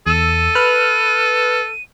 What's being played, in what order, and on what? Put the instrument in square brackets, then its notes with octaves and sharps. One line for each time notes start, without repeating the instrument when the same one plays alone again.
[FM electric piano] E2 E6 [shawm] A4 [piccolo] D#7
[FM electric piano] B4 F6 F#6